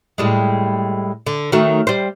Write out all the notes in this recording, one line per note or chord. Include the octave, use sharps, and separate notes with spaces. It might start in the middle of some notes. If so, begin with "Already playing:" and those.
A2 G3 G#3
D3
D#3 F#3 A3
G3 C5